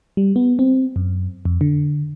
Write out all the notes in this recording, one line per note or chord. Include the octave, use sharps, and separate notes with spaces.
G3
B3
C4
F#2
F2
D3